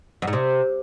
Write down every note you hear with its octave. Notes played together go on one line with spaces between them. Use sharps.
F#2
G#2
C3